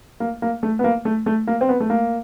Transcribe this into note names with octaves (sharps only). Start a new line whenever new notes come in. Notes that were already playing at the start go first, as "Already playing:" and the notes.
A#3
A#3
A3
B3
A#3
A3
A3
A#3
C4
B3
A3
A#3